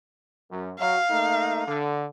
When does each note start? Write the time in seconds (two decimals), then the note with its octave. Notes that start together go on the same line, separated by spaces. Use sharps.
0.51 F#2
0.79 F#3 F5
1.09 A3 A#3 D#4
1.67 D3